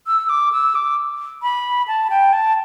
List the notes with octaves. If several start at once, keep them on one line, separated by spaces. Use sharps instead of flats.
E6
D6
E6
D6
B5
A5
G5
A5